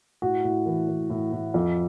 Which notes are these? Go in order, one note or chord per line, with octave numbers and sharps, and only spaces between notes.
A2 F#4
A2
E3
E3
A2
A2
F2